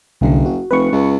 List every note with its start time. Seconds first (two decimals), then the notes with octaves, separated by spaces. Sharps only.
0.21 F#1 C2 D3
0.46 F#4
0.71 F1 B4 C#6
0.92 C#2